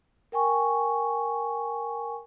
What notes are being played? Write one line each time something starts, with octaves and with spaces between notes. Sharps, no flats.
A#4 G5 G#5 C#6